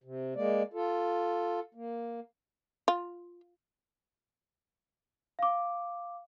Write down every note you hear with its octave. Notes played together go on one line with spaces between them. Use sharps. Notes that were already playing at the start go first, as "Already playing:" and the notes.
C3
G#3 A#3 D5
F4 A4
A#3
F4
F5 D6